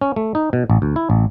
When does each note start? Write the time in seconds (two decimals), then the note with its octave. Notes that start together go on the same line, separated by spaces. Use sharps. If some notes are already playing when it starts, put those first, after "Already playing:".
0.01 C#4
0.16 A3
0.35 D#4
0.53 B2
0.70 A1
0.82 D2
0.96 E4
1.10 A1